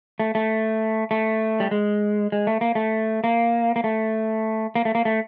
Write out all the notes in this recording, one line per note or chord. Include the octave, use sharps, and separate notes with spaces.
A3
A3
A3
G3
G#3
G#3
A3
A#3
A3
A#3
A#3
A3
A#3
A3
A#3
A3